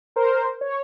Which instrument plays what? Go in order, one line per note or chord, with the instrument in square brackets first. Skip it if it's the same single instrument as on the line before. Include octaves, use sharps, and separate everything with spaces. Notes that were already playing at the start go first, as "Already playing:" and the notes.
[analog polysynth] A#4 C5
C#5